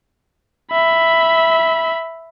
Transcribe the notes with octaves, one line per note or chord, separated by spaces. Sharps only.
E5 B5